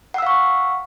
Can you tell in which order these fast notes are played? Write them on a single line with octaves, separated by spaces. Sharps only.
F#5 E6 F5 C#6